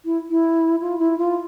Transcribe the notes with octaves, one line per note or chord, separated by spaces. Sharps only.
E4
E4
F4
E4
F4